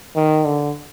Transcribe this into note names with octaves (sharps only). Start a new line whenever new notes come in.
D#3
D3